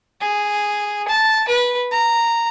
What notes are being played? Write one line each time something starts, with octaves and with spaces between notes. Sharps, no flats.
G#4
A5
B4
A#5